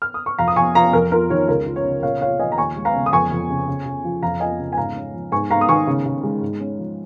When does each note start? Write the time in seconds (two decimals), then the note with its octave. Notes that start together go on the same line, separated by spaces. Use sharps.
0.02 F6
0.14 D#6
0.26 C#6
0.38 F2 F5 A#5
0.48 D#6
0.56 F2 G#5 C#6
0.75 F3 F5 A#5
0.93 F2 A#4
1.12 F4 A#4
1.30 D#3 C#5
1.48 C#2 A#4
1.66 F4
1.76 C#5
1.85 C#3
2.03 A#2 C#5 F5
2.21 F4 C#5 F5
2.39 F3 D#5 G#5
2.52 A#5
2.57 D#2 G#5 C#6
2.76 G#3
2.85 F5 A#5
2.95 C#3
3.06 D#6
3.13 F2 G#5 C#6
3.31 F2
3.50 C#3
3.68 C#3
3.86 C#3
4.04 F3
4.23 F2 F5 A#5
4.40 F4 D#5 G#5
4.59 C#3
4.73 G#5
4.77 G#2 F5 A#5
4.96 C#4
5.14 F3
5.32 G#2 G#5 C#6
5.50 G#2 F5 A#5
5.61 D#6
5.69 D#3 G#5 C#6
5.87 C#3
6.06 C#3
6.23 G#3
6.42 G#2
6.60 C#4
6.79 F3